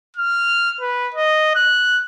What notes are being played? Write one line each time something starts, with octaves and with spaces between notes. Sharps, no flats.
F6
B4
D#5
F#6